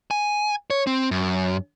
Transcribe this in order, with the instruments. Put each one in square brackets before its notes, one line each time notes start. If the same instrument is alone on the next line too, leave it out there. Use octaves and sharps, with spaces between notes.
[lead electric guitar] G#5
C#5
C4
F#2